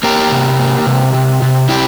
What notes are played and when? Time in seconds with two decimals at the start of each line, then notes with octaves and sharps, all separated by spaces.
0.03 A#3 G4 A#4
0.31 C3
0.59 A#3
0.86 C3
1.14 C3
1.42 C3
1.69 C3 E4 G4